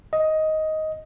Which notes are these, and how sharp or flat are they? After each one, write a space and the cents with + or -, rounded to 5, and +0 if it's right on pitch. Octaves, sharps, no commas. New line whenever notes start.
D#5 +10